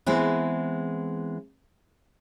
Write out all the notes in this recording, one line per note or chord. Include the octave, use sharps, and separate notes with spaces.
E3 G#3 B3 C4 E4